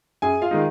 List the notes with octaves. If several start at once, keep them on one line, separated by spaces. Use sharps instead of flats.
F#2 G#4 G#5
F4 F5
D#3 G#3 D#4